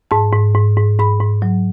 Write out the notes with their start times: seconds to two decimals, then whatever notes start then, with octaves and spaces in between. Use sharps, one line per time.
0.11 G#2 A5
0.33 G#2
0.55 G#2
0.77 G#2
0.99 G#2 B5
1.20 G#2
1.42 F#3